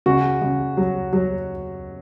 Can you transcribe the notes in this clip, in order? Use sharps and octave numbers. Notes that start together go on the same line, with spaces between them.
C#3 F#4
C#3
F#3
F#3